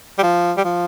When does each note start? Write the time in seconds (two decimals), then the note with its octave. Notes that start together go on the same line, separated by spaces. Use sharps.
0.18 G3
0.23 F3
0.57 G3
0.64 F3